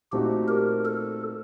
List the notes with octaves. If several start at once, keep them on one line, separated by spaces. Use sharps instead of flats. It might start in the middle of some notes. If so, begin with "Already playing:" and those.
A#2 A3 C4 D#4 F#4 G4
A#4
A4